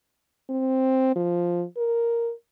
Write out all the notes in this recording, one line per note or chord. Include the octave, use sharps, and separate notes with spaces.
C4
F3
A#4